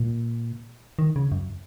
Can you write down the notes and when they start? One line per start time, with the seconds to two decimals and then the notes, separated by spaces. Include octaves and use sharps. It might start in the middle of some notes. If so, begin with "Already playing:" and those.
Already playing: A#2
0.99 D#3
1.16 C#3
1.32 F#2